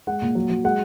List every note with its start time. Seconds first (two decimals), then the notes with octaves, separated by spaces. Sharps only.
0.07 G#3 F#5
0.22 A#2
0.35 F#3
0.50 F#3
0.64 G#3 F#5